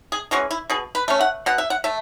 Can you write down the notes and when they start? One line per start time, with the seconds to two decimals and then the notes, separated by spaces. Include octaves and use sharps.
0.12 G#4
0.31 E3 G#3 C#4 F#4
0.51 E4
0.70 B2 G#4
0.95 B4
1.08 A3 C#4
1.21 F#5
1.46 B2 F#5
1.58 E5
1.70 F#5
1.84 A3 E5